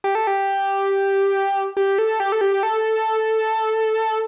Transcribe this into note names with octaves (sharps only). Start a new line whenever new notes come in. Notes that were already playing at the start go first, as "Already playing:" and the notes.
G4
A4
G4
G4
A4
G4
A4
G4
A4